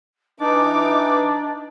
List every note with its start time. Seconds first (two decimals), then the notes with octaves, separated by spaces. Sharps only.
0.41 E3 D4 D#4 D#5 D6